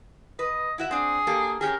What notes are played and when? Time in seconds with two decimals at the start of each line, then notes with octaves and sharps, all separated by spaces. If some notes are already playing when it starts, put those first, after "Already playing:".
0.39 B4 D#5
0.78 E4 F#4 E5
0.91 C4 D4 G#4
1.27 A#3 G4 A4
1.61 C#4 G4 G#4 A#4